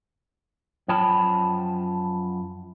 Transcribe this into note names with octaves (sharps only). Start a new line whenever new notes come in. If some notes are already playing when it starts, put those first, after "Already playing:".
F#2 F3 C#5 G5 A5 B5